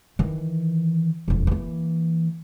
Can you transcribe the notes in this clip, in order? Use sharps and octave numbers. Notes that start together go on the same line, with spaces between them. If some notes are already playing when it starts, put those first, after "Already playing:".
D#3 E3
E1 F2
E3 A#3